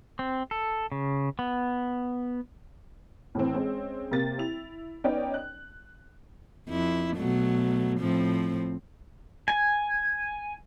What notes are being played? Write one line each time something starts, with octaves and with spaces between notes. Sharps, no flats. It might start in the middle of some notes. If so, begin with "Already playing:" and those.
C4
A4
C#3
B3
A2 E3 C4
G#3 C4 C#4
C3 A#3 A6
E4 F7
B3 C#4 D#4 D5 G5
F#6
F2 E4
B2 F#3 A3
A2 F3 C4
G#5